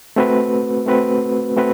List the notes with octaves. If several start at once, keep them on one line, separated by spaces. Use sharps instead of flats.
A3 C4 F#4 B4
A3 C4 F#4 B4
A3 C4 F#4 B4